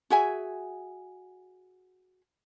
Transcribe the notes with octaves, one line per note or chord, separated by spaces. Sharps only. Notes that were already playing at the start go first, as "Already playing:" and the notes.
F#4 G#4 E5 G#5